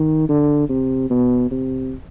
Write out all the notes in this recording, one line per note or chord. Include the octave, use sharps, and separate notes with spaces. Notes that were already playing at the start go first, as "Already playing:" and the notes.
Already playing: D#3
D3
C3
B2
C3